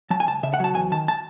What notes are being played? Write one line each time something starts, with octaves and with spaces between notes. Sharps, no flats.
F#3 A5
G#5
C#2 A5
C#3 E5
F#5
F#3 A5
E2 G#5
D#3 A5
A5